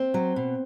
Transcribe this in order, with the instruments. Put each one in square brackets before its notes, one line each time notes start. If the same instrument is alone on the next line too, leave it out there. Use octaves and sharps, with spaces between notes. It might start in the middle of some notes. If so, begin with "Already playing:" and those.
Already playing: [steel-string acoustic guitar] C4
F#3
B2